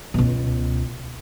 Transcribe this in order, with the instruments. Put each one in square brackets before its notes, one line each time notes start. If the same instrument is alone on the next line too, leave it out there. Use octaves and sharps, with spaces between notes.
[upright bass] C#2 B2